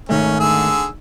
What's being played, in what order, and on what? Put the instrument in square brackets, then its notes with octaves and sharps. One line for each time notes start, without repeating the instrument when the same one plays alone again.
[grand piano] G#1 G#2 A3 [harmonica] C#4
[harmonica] D3 G#4 E6